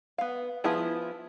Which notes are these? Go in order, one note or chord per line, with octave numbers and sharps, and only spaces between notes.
B3 F5
F3 B3 E4 G#4